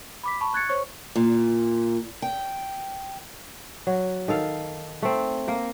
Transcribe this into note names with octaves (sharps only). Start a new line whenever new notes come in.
B5 D6 B6
A5 B5 C#6
C#6 F#6 G#6 A6 C#7
C5 C#5 C#6
A#2
G5
F#3
D#3 A4 F5
A3 C4
A#3 A#4